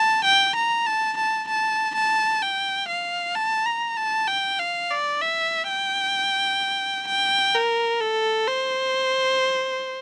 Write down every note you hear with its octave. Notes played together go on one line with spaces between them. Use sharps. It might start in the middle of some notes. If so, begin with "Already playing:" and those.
Already playing: A5
G5
A#5
A5
A5
A5
A5
G5
F5
A5
A#5
A5
G5
F5
D5
E5
G5
G5
A#4
A4
C5